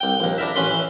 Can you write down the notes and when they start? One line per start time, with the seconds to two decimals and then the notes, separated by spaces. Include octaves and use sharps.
0.01 C2 G5
0.20 A#1 D#2
0.38 D4 E4 A#4 E5
0.56 A1 C#4 B4 C6
0.70 E3